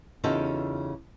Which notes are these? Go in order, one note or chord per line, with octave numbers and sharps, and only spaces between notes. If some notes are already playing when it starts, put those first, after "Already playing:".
E2 C#3 D#4 F4 G4 A4